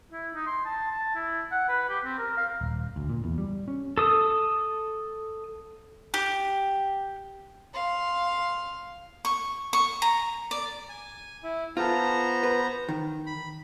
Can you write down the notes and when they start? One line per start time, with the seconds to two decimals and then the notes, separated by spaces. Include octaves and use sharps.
0.12 E4
0.34 D#4
0.47 C6
0.66 A5
0.91 A5
1.15 E4
1.52 F#5
1.68 B4
1.89 G4
2.04 C4
2.18 A#4
2.37 F5
2.61 D#1
2.96 D2
3.10 A#2
3.24 E2
3.38 G3
3.68 C#4
3.98 A4 D#6
6.14 G4
7.74 F5 C6
9.25 C#6
9.73 C#6
10.02 A#5
10.51 D5
10.89 G#5
11.43 E4
11.77 B3 F4 A4 C5 A#5
12.43 B4
12.89 D#3
13.26 B5